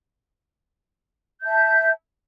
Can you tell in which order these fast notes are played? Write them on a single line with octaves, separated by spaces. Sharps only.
G6 E5 A5